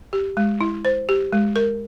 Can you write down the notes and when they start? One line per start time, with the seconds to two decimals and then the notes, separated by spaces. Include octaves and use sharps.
0.13 G4
0.37 G#3
0.61 E4
0.85 C5
1.09 G4
1.33 G#3
1.56 A#4